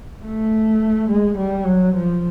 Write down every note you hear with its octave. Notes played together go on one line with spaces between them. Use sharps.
A3
G#3
G3
F#3
F3